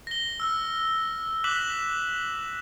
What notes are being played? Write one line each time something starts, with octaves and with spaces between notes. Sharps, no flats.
A#6 G7
E6 F6
D6 F#6 B6 E7 F#7